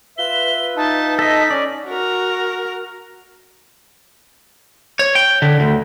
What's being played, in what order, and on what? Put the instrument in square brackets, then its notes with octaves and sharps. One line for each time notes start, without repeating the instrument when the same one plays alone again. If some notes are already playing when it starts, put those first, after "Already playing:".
[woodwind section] F4 B4 E5 [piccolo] G7
[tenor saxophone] D#4 [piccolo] A5
[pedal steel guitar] A4 D#5 [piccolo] B6
[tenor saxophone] C#4 [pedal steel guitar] D5
[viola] F#4 A#4
[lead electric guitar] C#5
G5
D3
D2